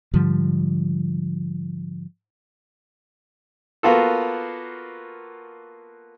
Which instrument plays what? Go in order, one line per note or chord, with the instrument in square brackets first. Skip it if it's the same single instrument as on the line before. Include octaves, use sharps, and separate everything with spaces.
[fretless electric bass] G#2 D3 F3 G3
[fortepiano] A#3 B3 F4 F#4 A4